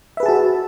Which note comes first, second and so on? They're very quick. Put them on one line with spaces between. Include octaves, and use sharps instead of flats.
E5 B4 G#4 A5 F#4